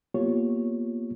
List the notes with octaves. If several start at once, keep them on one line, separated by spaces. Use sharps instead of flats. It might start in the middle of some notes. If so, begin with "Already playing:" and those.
A#3 B3 F4 G4 C#5